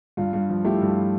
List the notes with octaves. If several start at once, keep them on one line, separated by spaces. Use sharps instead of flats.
G2 F4
G2
F3
A3 E4 G4
G2
F4